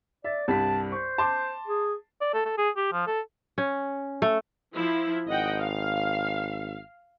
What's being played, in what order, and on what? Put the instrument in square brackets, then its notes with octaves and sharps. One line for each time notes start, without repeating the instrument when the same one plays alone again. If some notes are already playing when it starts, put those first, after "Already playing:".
[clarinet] D5 [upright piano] E5
[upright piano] C2 G2 B6 [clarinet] A5
[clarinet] C5 [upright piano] C#6
[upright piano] A5 C6 D6
[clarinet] G#4
[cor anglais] D5
A4
A4
G#4
G4
F3
A4
[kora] C#4
A3
[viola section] F3 E4
[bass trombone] G#1 [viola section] D#5 F#5 G5
[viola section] F5